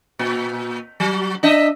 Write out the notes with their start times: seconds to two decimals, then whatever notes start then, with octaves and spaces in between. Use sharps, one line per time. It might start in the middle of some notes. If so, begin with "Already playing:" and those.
0.19 A#2
1.00 F#3
1.43 D4 D#5 E5